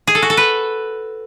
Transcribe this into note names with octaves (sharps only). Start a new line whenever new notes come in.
G#4
A4
F#4
A4
B4